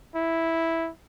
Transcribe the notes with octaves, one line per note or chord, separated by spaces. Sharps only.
E4